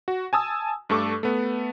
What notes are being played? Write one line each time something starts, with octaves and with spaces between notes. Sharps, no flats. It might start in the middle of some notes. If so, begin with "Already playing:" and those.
F#4
G#5 A5 D#6 E6
G2 A3 A4 C#6 D6
A3 B3